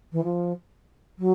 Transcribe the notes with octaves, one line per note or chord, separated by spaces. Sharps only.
E3
F3
F#3